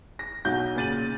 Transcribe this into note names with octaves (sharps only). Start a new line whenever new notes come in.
A#6
B1 F#4 G6
A#2 C#3 A6 D#7 F#7